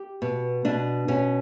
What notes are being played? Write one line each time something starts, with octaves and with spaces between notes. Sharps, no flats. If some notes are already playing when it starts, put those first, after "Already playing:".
Already playing: G4
B2
B2 D4
B2 C#4